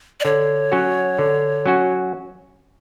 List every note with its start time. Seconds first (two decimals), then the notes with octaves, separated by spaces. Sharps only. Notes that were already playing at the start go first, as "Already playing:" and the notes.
0.20 D5
0.25 D3 C#5
0.72 F#3 C#4 F#4
1.19 D3
1.66 F#3 C#4 F#4